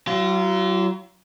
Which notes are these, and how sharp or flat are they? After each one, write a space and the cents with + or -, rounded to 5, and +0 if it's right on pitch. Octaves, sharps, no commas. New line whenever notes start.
F#3 +35 F4 -30